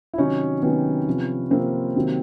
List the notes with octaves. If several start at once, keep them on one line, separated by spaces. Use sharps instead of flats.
E4
C3 D#3 F#3 C#4 D#4
C3 D#3 F#3 B3 C#4
C3 F3
C3 F3 A#3 C4
C3 D#3 F#3